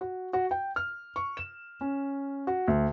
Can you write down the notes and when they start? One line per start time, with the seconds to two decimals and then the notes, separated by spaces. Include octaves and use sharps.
0.01 F#4
0.33 F#4
0.51 G5
0.76 F6
1.16 C#6
1.37 E7
1.81 C#4
2.47 F#4
2.68 D2